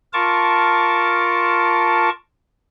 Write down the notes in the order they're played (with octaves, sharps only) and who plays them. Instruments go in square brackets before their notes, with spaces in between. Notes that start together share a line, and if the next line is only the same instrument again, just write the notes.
[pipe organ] F4 A#4 A5 C#6 D6